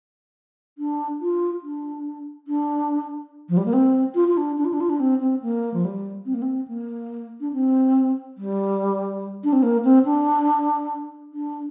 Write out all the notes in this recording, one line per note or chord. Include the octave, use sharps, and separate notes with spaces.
D4
F4
D4
D4
F3
G3
A#3
C4
F4
F4
D4
D4
F4
D4
F4
D4
C4
C4
A#3
F3
G3
C4
A#3
C4
A#3
D4
C4
G3
D4
C4
A#3
C4
D4
D4